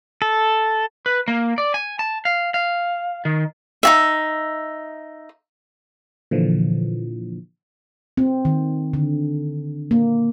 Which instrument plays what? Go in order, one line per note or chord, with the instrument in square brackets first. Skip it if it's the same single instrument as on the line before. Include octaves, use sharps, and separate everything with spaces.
[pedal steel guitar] A4
[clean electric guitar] B4
A#3
D5
G#5
A5
F5
F5
D#3
[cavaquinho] D#4 F#4 E5
[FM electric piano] A#2 D3 E3 F3
[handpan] C4
D#3
D3
A#3